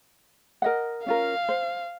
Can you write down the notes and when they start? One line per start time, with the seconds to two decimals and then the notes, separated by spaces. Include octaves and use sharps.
0.62 A#4 D#5 F#5
1.06 C#4 F4 A#4 F5
1.49 C5